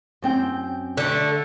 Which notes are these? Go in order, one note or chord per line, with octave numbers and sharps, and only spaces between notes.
F#2 C4 G5
D3 A3